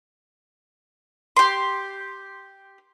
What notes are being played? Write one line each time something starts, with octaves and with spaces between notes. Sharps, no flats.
G4 C6